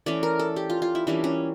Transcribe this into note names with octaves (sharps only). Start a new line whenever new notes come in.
E3 A3 C#4 D5
A#4
A4
G4
F4
F4
E4
E3 G3 A#3 C#4 D4
C#4